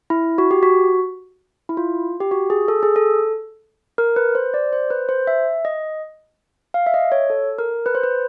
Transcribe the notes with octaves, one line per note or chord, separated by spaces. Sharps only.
E4
F#4
G4
F#4
E4
F4
G4
F#4
G#4
A4
G#4
A4
A#4
B4
C5
D5
C5
B4
C5
E5
D#5
F5
E5
D#5
C#5
A4
A#4
B4
C5
B4